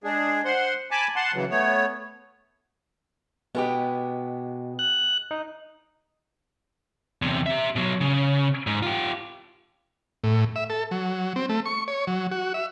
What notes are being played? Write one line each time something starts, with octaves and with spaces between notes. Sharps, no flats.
G#3 D4 G#4
C5 F#5 C6
G#5 A5 B5 D6
F#5 A5 C6
C#3 E3 F#3
A3 B3 C#5
B2 G#3 B3 G4
F#6
D#4
E2 C3
G4 E5
B2 F#3
C#3
G#2
F4 G4
A2
E5
A4
F#3
C4
A3
C#6
C#5
F#3
F#4
E5